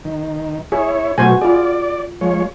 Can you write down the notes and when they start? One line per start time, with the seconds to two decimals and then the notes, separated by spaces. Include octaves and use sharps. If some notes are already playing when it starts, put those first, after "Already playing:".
0.05 D#3
0.72 E4 G#4 C#5
1.18 B2 F#3 A3 F#4 C5 G#5
1.41 F4 G#4 D5
2.21 F3 G#3 C#5